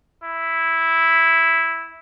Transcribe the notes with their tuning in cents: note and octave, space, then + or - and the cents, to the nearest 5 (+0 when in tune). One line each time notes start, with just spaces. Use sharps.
E4 -5